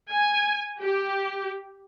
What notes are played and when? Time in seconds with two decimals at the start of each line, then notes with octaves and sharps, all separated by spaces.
0.11 G#5
0.82 G4